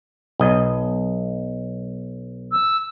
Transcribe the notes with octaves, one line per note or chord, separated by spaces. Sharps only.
B1 D#5
E6